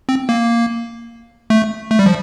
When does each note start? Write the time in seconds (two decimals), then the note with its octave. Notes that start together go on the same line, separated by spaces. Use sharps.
0.09 C4
0.29 A#3
1.50 A3
1.91 A3
1.99 G3
2.06 F3